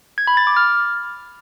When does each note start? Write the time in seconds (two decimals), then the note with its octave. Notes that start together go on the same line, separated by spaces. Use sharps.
0.18 G#6
0.27 B5
0.37 A6
0.47 D6
0.57 F6